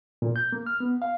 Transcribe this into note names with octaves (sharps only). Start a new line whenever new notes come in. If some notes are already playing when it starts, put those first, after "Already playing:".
A#2
G6
A#3
F6
B3
F5